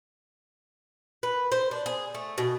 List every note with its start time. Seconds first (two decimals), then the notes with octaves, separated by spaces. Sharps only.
1.23 B4
1.52 C5
1.71 D4
1.86 G#4
2.15 A3
2.38 B2